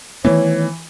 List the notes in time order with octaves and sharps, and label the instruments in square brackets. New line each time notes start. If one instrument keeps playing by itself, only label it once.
[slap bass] D#3 A3 B3 [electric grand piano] E3 [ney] C#5